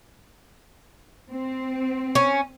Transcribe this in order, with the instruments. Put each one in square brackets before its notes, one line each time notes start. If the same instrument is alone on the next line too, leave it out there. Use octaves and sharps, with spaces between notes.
[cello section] C4
[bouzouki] C#4